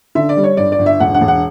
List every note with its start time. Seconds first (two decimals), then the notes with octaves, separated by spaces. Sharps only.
0.15 D3 E5
0.29 D5
0.37 G3
0.44 C#5
0.57 G1 D5
0.72 D5
0.79 G1
0.86 E5
1.00 E1 F#5
1.14 F#5
1.21 E1
1.28 F#5